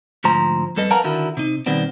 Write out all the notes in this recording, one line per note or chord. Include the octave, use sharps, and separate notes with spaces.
D2 G#2 F3 C5 A#5
F2 G3 A4 B4 D#5
A#4 B4 F5 F#5 A5 A#5
D3 D#3 E4 F#4 A#4
C3 D#4
B2 D#3 G3 B3 C4